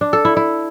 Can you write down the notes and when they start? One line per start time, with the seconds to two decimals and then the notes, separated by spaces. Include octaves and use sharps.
0.01 D4
0.13 A4
0.25 E4
0.37 E4